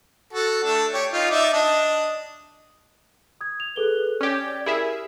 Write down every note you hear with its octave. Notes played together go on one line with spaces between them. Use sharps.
F#4 A4
A3 D4 A4
G4 C#5
D#4 F4
D#4 D5 E5
D4 D#5
D#6 G#6
F7
G#4 A4 B4 G7
C#4 G4 D5 G#6
E4 G4 G#4 A#4 E5